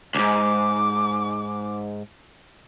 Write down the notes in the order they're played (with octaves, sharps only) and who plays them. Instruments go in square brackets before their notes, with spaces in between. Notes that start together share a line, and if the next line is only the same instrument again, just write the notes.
[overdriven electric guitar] C#2 G#2 [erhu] D6